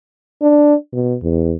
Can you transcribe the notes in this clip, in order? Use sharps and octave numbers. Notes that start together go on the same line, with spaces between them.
D4
B2
E2